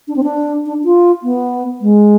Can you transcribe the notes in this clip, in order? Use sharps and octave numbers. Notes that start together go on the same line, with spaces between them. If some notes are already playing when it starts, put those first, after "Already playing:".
D4
C4
D4
D4
F4
B3
G#3